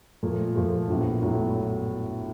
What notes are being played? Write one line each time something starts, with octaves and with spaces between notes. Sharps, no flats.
A#2 F3 A3
A#2 F3 A3
A#1 A2 F#3 B3
A2 F#3 B3